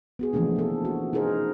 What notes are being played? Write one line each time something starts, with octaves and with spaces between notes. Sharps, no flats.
B3 F#4 G#4
E3 F3 A3 A#3 D4
F4 A4
C#4 F#4
D#4 F4 G#4 A#4 C5